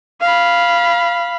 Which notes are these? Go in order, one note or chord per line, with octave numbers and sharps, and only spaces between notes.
F5 B5